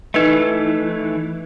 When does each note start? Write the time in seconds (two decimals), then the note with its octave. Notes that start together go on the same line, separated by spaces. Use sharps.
0.14 E3 A3 D#4 B4 D#5